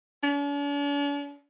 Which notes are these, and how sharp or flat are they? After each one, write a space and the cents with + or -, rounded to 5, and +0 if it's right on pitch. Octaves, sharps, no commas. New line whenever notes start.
D4 -45